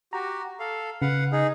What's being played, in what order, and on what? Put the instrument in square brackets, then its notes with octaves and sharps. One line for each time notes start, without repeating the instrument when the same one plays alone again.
[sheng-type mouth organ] F#4 G4 [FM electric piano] A#5
[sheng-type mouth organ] A4 F5
[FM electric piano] C#3 [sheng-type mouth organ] B4 F5 F#5
[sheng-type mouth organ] D#4 G#4